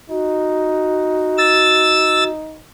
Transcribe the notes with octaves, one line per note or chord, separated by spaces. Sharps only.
D#4 F#4
E6 A6